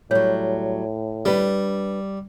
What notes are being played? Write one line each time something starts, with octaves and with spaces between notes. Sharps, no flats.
A2 F#3 G3 C#5
G3 D4 B4